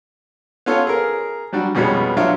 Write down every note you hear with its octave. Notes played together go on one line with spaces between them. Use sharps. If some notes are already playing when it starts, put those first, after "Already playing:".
B3 C#4 F4 A4 C#5
G#4 A#4
F#3 G3 D4 F#4
F2 B2 G3 G#3 B3 C#4
F#3 D4 F4 C#5 E5